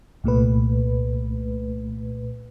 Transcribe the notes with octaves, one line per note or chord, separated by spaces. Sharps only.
C2 A#2 A3 B4